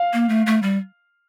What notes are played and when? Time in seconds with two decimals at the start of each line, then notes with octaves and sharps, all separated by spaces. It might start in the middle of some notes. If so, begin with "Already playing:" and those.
Already playing: F5
0.13 A#3
0.29 A3
0.46 A3
0.63 G3